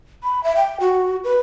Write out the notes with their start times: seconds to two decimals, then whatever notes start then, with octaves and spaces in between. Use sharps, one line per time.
0.23 B5
0.44 E5
0.57 G5
0.80 F#4
1.24 B4